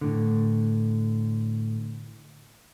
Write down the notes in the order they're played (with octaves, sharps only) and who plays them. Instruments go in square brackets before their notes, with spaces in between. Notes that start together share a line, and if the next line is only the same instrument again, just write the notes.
[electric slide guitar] A2 D3